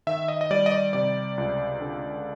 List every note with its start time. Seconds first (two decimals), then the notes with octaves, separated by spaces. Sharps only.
0.07 D#3 E5
0.28 D#5
0.41 D#5
0.51 G3 D5
0.66 D#5
0.72 D5
0.93 C3 D5
1.38 C#2
1.81 D3